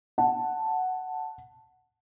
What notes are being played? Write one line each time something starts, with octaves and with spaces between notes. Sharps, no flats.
F#5 A5